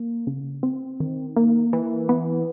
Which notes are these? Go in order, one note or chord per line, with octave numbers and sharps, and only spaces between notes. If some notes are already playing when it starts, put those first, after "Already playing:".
Already playing: A#3
C#3
C4
D#3
A#3
E3
B3